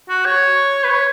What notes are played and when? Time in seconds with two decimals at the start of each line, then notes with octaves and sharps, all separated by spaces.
0.09 F#4
0.25 C#5
0.84 B4
0.89 C#5